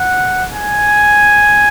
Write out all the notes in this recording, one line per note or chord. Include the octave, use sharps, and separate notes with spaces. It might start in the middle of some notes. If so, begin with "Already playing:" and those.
Already playing: F#5
G#5